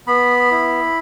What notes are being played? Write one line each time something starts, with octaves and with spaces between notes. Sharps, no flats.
B3 B5
E4